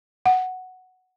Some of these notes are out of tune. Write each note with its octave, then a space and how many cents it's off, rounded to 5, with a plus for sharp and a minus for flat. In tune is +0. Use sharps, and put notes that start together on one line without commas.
F#5 +0